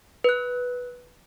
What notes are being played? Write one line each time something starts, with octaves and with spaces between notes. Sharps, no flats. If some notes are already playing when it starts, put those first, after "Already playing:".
B4 F#6